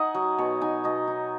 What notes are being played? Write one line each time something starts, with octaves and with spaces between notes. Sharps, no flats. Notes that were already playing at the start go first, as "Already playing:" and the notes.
Already playing: D#4 D#5 F#5 G#5
F#3
B2 C#5
D#4 G#5
B2 D#5
D#4